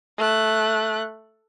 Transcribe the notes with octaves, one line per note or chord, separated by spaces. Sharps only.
A3 F#6